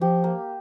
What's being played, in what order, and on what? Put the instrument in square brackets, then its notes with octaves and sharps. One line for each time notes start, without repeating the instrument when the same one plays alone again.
[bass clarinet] F3 [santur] G4
[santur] A#3